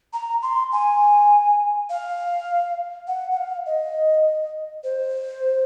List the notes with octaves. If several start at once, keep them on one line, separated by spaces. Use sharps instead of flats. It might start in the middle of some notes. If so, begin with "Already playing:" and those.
A#5
C6
G#5
F5
F#5
F#5
F5
D#5
C5